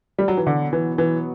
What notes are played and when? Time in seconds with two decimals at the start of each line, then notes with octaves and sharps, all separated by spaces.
0.19 G3
0.28 F#3
0.37 E3
0.47 B2 D3 F#3 B3
0.73 E3
0.98 E3